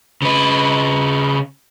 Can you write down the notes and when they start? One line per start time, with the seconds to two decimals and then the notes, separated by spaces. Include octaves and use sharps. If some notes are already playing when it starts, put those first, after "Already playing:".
0.22 C#3 B4